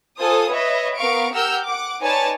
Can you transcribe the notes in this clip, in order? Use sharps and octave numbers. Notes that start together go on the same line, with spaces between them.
F4 A4 C5 G#5 D#6
B4 C#5 D#5 E5
B3 A#4 F5 C#6 D7
G4 A#4 F#5 E6 F6 G6
F#5 D6
D#4 B4 C#5 D5 G#5 A5